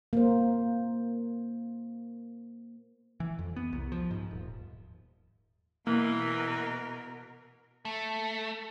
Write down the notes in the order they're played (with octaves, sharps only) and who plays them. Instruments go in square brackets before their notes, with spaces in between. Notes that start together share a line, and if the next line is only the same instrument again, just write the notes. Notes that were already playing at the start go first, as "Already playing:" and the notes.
[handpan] A#3 C5
[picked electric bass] E3
F2
B3
C2
F3
G#2
D#1
[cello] B2 A#4 [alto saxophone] E3 [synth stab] A#3
[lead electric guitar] A3